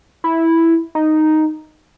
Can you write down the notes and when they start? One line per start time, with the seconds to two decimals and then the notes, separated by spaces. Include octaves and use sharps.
0.24 E4
0.95 D#4